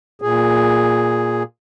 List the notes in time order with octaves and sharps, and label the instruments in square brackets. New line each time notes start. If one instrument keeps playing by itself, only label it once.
[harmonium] A#2 G#4